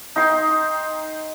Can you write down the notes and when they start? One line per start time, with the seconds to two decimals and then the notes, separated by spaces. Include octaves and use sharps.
0.16 D#4 G5 C6